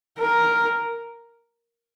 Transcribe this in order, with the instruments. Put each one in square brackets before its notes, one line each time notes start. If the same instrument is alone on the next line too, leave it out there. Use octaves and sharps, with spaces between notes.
[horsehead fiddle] A#4